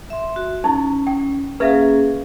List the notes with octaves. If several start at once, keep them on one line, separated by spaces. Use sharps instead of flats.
E5 C6
F#4
C#4 D#4 E4
G5
A#3 C#4 G#4 B4 E5 F5